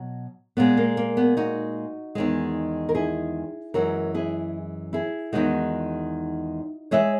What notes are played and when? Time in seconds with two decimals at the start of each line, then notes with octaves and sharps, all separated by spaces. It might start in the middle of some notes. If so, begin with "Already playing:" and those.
Already playing: B2 F#3
0.57 A#2 G#3 B3
0.77 A#3
0.97 A#3
1.17 B3
1.37 D#4 F#4
2.15 E2 D#3 G#3
2.89 A#4
2.95 E4 G#4
3.74 F#2 E3 G#3 F#4 A#4
4.15 E4 G#4
4.93 E4 G#4
5.33 E2 D#3 G#3 D#4 F#4
6.91 E3 G#3 C#5 E5